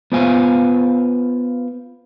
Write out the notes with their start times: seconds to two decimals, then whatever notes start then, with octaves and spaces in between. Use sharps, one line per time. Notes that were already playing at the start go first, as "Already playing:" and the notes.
0.12 B3 F4 C5 F5 G#5